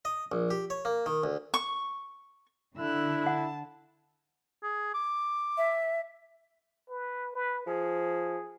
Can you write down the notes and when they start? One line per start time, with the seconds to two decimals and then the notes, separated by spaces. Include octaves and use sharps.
0.05 D#5
0.32 A#1
0.51 G4
0.70 C#5
0.85 A#3
1.06 D#3
1.24 D2
1.54 C#6
2.78 D3 E4 E6 F#6
3.26 F#5 A5
4.63 G#4
4.94 D6
5.58 E5
6.90 B4
7.35 B4
7.67 F3 G#4